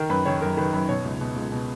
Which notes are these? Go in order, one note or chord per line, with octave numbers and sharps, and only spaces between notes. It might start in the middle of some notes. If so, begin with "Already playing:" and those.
Already playing: D#3 A#4
F#2 B4
D#3 C#5
F#2 A#4
D#3 B4
F#2 B4
B2 C#5
C#2
B2
C#2
B2